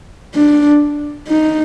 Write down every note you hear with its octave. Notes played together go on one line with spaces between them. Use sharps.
D4
D#4